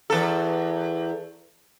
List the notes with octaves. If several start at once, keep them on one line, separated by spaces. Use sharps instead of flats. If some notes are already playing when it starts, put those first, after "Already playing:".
E2 A4